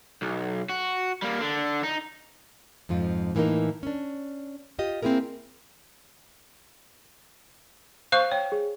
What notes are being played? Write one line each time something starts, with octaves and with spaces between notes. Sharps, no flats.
B1
F#4
G3 A#3
D3 D4
D#4
F2 G#2 F3 F4
A2 E3 A#3 C#4 D#4
C#4 D4
F4 G4 D#5
A#3 C4 C#4 E4 G#4 A#4
C5 F5 C#6 F#6
C#5 G5
G#4